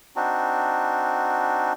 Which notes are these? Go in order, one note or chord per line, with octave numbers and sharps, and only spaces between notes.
C4 D4 D#4 F#4